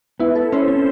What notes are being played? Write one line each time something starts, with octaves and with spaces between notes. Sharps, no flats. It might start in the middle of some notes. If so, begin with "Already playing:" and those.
B3 E4
A4
C#4 C5
C4